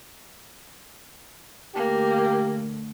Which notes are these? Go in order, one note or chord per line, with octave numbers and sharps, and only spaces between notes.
D3 A3 A#3 G4